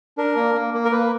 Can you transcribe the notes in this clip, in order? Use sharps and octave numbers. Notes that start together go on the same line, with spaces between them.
D4 A#4
A#3
A#3
A#3
A#4
A#3 B4